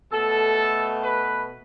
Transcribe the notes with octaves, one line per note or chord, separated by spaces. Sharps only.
B2 A3 A4
B4